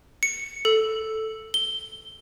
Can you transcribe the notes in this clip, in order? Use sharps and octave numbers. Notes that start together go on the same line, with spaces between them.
C#7
A4
G7